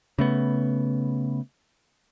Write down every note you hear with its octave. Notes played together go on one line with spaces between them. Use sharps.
C#3 A3 B3